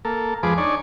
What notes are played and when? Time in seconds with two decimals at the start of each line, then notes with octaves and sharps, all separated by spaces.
0.05 A#3 A4
0.43 F2 F3 G#3 G#4 B4 D6
0.58 D4 D#4 C#5 D5 G#5